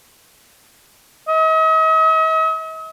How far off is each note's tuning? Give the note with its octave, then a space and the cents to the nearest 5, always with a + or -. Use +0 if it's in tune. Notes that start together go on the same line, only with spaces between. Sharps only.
D#5 +45